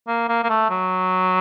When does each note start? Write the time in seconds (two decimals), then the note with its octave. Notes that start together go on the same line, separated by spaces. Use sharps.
0.07 A#3
0.29 A#3
0.44 A#3
0.49 A3
0.70 F#3